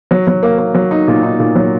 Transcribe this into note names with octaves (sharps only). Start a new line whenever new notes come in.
F#3
F#3
A#3
A#3
F#3
D#4
A#2
D#4
A#2
F#3